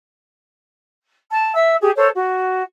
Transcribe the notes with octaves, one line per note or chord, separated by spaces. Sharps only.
A5
E5 E6
G4 G#4
A4 C5 C#5
F#4